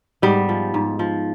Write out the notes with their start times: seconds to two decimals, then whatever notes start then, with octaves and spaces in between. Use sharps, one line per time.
0.22 G#2 G3 B3
0.49 F3
0.74 G#2
0.99 F3